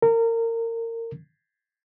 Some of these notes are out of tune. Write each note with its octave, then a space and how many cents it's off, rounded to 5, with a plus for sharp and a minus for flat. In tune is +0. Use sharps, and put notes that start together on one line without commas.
A#4 -30